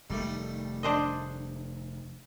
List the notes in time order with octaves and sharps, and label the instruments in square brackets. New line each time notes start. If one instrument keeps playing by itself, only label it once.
[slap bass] F1 D#3 [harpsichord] G3 A3
[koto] D4 C5 D#5